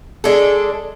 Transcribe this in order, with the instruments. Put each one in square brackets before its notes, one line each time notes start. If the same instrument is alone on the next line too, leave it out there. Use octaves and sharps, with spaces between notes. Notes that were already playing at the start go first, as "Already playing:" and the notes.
[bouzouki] G#3 D4 A4